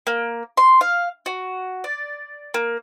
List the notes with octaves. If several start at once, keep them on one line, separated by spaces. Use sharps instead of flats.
A#3
C6
F5
F#4
D5
A#3